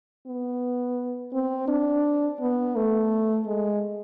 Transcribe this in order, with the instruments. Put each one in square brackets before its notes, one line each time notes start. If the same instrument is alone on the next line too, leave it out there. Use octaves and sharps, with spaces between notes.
[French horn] B3
C4
D4
B3
A3
G#3